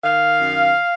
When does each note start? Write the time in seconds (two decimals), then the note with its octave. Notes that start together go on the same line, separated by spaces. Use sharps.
0.03 D#3 F5
0.40 F#2